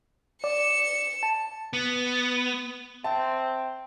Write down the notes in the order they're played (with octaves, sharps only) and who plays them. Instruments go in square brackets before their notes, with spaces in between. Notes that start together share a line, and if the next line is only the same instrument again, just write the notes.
[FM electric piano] D5 [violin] C#7 E7
[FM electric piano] A5
[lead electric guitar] B3
[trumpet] C4 [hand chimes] E5 G5 [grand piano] A5